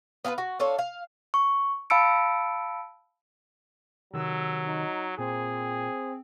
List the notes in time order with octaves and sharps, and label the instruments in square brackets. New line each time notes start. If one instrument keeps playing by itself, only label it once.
[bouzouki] B3 F4 G#4 B4
F#4
D4 F4 A4 C#5
F5
[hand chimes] C#6
F5 A5 B5 E6 C#7 D7
[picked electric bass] C3 D#3 [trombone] F#3 [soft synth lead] E6
[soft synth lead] D#4
[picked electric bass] A#2 [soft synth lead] C4 [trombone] G#4